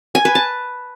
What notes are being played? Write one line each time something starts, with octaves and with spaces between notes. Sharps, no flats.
G#5
B4
A5